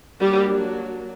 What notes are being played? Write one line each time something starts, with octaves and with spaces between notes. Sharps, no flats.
F#3 G3 A#3 D4 G4